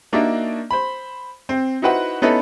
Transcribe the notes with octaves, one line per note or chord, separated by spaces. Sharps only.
A#3 D4 D#4 F#4 D5 E5
C5 B5
C4
D#4 E4 F#4 B4 C5 F#5
B3 C#4 D#4 E4 A4 B4